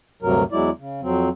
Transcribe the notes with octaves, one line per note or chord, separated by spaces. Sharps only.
D2 G2 C3 F#3 A#4
E2 F#3 G#3 E4 D5
C#3
F2 F#3 C4